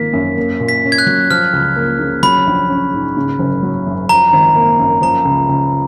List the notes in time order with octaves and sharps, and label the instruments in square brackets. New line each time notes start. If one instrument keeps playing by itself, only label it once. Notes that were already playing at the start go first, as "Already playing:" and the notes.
Already playing: [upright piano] G#1 F3 A#3 [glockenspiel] B6
[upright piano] F#2
A#3
A#2
[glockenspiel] B6
[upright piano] C#4
[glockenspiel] G#6
F#6
[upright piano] F#3
[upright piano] F3 [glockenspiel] F6
[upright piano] C#2
A#3
C#3
[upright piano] F#3 [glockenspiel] B5
[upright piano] A#1
C#4
G#2
C#3
F#1
F#3
F#2
[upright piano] F3 [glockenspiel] A#5
[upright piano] G#1
A#3
F#2
[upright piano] F3 [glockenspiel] A#5
[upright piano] C#2
C#2